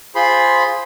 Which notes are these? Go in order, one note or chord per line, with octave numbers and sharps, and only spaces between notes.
F4 G#4 C5 B5 C6